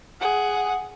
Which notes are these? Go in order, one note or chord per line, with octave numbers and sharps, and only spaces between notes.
G#4 F#5